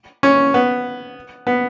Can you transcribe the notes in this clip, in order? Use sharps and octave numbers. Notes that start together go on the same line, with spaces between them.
C#4
B3
B3